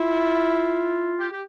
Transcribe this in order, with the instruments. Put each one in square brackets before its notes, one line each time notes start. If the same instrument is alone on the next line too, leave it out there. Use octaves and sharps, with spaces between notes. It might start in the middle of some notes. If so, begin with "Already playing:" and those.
Already playing: [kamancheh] E4 [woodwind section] F4
[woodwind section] G4
G4